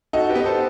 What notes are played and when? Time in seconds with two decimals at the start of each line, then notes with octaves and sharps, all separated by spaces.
0.13 D#4 F#4 A4
0.29 G4 B4
0.35 B3 D#5
0.46 A4 C5